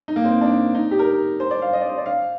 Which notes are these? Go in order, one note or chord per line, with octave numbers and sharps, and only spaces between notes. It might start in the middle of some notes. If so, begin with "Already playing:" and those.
D#4
A#3
C4
D4
D#4
G4
A#4
C5
D5
F5
D#5
D5
C5
D5
F5